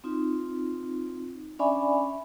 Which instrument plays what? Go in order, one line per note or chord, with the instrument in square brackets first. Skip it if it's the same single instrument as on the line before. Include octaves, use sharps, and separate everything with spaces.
[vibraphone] C4 D#4 F4
C#4 D4 D5 E5 G#5 B5